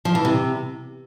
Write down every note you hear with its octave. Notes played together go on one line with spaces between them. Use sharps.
F3
E3
C3